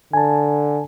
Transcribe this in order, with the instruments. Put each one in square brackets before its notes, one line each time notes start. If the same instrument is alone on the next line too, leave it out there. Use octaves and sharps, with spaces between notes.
[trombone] D3 [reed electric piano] G#5 A5